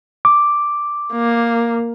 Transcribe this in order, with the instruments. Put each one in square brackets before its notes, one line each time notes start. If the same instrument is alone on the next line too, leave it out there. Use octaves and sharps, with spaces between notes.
[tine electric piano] D6
[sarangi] A#3